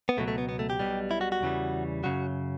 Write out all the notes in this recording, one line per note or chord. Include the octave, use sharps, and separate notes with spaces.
B3
C#2 B2 F#3 A3
A3
B3
B3
A3
G4
B1 B2 G3
E4
F#4
F#4
E2 C#3 E3 G3
F#2 C#3 F#3 F#4